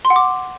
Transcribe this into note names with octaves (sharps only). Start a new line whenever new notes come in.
C6
F#5
D6